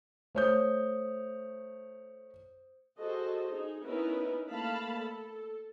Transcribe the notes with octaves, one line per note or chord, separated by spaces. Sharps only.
A3 C5 C#5 D#6 G6
F#4 G#4 A4 C5 D#5
D#4 G#4
B3 C#4 D#4 E4 A#4 B4
A3 A#3 F5 A5 B5
A4